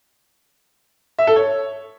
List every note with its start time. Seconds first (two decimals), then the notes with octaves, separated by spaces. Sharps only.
1.19 E5
1.27 A4
1.36 C#5